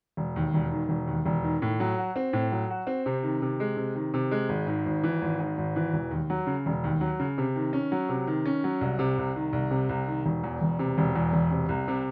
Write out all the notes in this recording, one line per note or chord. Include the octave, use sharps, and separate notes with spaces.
E1
D#2
E1
D#3
E1
D#2
E1
D#3
A2
F#3
F#4
C4
A2
F#3
F#4
C4
C3
D#3
C3
G#3
C3
D#3
C3
G#3
G#1
G#2
G#1
E3
G#1
G#2
G#1
E3
E1
D#2
F#3
C#3
E1
D#2
F#3
C#3
C3
D#3
C#4
F#3
C3
D#3
C#4
F#3
C2
C3
C2
D#3
C2
C3
C2
D#3
E1
E2
E1
C3
E1
E2
E1
C3
C2
C3